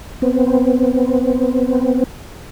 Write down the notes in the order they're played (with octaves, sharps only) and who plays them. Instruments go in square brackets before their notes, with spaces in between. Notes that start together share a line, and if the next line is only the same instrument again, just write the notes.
[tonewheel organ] B3 C4